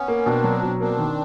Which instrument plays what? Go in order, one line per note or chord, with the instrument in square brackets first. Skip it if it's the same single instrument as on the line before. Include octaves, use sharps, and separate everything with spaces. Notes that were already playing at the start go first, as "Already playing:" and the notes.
Already playing: [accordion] B3 C#4
[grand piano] A#3
[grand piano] B2 [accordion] C4 D4
[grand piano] F#3
B2
[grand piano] A#3 [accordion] C4 D4
[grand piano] D#3